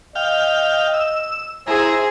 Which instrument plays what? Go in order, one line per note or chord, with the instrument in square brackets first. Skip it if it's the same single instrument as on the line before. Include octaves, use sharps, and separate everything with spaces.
[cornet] D#5 [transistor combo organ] F5 G5
[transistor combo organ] E6
[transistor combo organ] E4 A#5 [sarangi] G#4 [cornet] C5